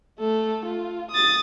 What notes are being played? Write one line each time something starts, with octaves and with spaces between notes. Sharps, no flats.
A3 A4
F4
D#6 A6